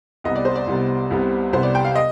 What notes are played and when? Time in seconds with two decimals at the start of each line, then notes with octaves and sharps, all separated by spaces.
0.24 C2 C3 G3 B3 D#5
0.35 D5
0.45 C5
0.55 D5
0.67 C2 C3 G3 B3
1.10 C2 C3 G3 B3
1.53 C2 C3 G3 B3 C5
1.63 D5
1.75 G5
1.85 F5
1.95 D#5